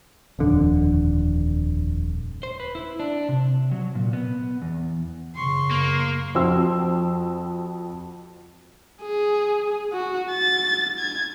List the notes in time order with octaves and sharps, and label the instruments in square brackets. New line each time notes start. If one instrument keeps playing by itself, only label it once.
[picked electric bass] D#1 F2 D3
[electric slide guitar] C5
B4
E4
D4
C3
F#3
A#2
B3
E2
[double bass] F#2 C#3 [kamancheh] C6 C#6
[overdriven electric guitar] A#3
[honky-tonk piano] F2 C4 F#4 C6 E6
[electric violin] G#4
F#4
A6
G#6